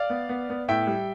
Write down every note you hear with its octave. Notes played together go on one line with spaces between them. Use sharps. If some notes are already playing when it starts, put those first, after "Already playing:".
Already playing: D5 F5
B3
B3
B3
A2 E5 G5
G3